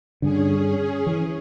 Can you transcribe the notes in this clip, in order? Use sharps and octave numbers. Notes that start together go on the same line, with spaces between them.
G2 D3 C#4 G#4
E3